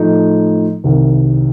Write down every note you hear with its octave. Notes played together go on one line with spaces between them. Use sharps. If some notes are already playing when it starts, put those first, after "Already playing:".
Already playing: A2 F3 A3 D#4
C2 C3 D#3